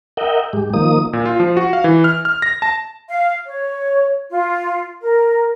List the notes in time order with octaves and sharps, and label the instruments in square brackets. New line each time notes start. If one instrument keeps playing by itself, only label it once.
[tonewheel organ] A#4 D#5 E5 F#5 G5
G#2 G#3 G4
D#3 F3 A#3 D#6
[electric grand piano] A#2
F4
F3
F#4
F5
E3
F6
F6
A#6
A5
[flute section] F5
C#5
F4
A#4